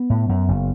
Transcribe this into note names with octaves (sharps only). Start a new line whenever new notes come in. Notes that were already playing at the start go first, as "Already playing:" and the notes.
Already playing: B3
A2
F#2
F#1